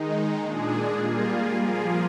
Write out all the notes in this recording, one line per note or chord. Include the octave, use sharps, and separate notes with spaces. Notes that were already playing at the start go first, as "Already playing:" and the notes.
Already playing: D#3 G#3 D#4
A#2 G#3 D4 G#4
G3 A#3 F4 G#4
F3 A#3 F4 G#4